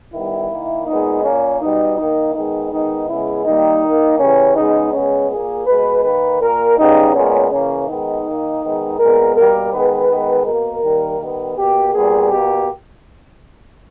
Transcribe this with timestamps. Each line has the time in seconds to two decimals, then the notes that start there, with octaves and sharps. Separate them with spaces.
0.13 D#3 G3 B3 E4
0.50 D#3 A#3
0.87 A#2 G#3 B3 D#4
1.24 A#2 A#3 C#4
1.61 B2 G3 B3 D#4
1.98 D#3 A#3 D#4
2.35 D#3 G#3 B3 D#4
2.72 D#3 G#3 B3 D#4
3.08 C#3 G#3 B3 E4
3.45 D#3 G3 A#3 D#4
3.83 D#3 A#3
4.19 C#3 E3 G3 C#4
4.56 C#3 G#3 B3 D#4
4.93 C#3 G#3 B3 C#4
5.30 A#2 A#3 G#4
5.66 B2 G#3 B3 B4
6.03 D#3 A#3 B4
6.40 A#2 A#3 A#4
6.77 C#3 G3 B3 D#4
7.14 A#2 G#3 B3 C#4
7.51 C#3 E3 A#3 C#4
7.88 D#3 G#3 B3 D#4
8.25 D#3 A#3
8.62 D#3 G#3 B3
8.99 A#2 G#3 B3 A#4
9.36 B2 G3 A#3 A#4
9.72 D#3 G#3 B3 B4
10.10 D#3 G#3 B3
10.46 B2 A#3 A#4
10.83 D#3 G3 A#3
11.20 D#3 G3 B3
11.57 B2 A#3 G4
11.94 A#2 G3 B3 G#4
12.31 B2 A#3 G4